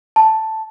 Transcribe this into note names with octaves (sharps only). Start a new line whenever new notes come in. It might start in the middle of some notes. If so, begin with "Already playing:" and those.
A5